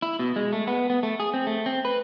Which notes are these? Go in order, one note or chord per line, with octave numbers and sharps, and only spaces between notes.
E4
B2
G#3
A3
B3
B3
A3
G#4
C4
A3
C4
B4